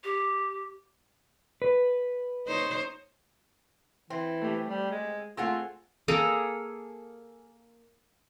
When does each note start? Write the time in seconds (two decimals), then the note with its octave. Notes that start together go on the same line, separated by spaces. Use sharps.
0.04 G4
1.62 B4
2.47 D#4 C5 C#5
4.10 E3 C4
4.42 A3 G4
4.67 G3
4.91 G#3
5.37 A3 C4 F4 G#4 F#5 E6
6.08 A#3 G#4 A4 A#5